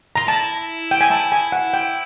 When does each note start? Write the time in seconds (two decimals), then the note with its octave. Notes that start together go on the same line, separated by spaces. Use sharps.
0.16 F4 A#5
0.28 E4 A5
0.91 G5
1.01 G#5
1.11 E4 A5
1.32 G#5
1.52 F#5
1.74 G5